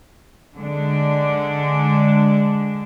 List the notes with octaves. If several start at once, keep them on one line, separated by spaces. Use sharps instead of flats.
D3 G#3 D4